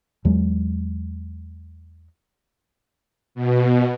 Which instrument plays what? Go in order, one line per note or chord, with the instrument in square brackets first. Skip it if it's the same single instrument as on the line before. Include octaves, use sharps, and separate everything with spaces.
[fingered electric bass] E2 F#3 G#3
[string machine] B2